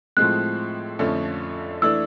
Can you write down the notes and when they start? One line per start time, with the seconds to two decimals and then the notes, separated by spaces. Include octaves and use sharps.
0.17 A2 F3 G#3 C4 F#6
0.99 F2 D3 F3 A3 C#4
1.82 E3 A3 D4 E6